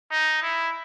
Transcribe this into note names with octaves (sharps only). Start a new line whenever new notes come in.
D#4
E4